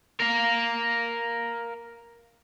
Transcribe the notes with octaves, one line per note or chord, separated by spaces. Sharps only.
A#4 F5